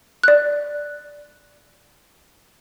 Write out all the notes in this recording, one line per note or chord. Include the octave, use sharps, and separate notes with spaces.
D5 F#6